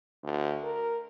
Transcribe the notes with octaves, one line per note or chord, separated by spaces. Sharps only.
D2
A#4